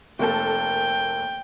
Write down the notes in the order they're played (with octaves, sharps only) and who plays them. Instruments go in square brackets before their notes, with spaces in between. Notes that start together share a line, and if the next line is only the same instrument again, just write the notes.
[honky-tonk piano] F1 A#3 A4 [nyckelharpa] G5